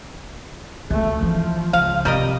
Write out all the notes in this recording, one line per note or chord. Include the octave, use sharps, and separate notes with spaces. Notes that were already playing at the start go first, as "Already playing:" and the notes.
D2 A3
E3 F3
C#2 F5
C3 G3 A#4 D#5